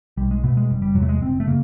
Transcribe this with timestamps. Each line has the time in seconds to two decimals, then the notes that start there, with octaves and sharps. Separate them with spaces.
0.17 B1 G3
0.31 G#3
0.44 B2 A3
0.57 G#3
0.70 F#1 G3
0.82 G3
0.95 E2 C3 F#3
1.02 A3
1.09 G#3
1.22 F#1 C4
1.40 A3
1.47 C#3 A#3